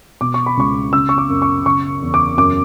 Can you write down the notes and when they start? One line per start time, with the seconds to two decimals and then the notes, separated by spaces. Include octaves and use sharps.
0.21 B2 D6
0.34 C#6
0.46 B5
0.57 C#2 C#6
0.93 C#3 E6
1.09 C#6
1.18 D6
1.29 F#2
1.42 C#6
1.65 C#3 C#6
2.02 E2
2.14 D6
2.37 F#2 D6